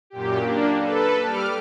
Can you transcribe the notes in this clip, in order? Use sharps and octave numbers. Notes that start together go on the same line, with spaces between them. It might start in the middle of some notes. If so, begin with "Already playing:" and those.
F#2 A#2 G4
A#3 D4
A4 B4
G3 D6 F6